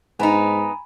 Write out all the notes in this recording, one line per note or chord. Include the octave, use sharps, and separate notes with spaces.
G#2 B3 D#4 G#5 A#5 B5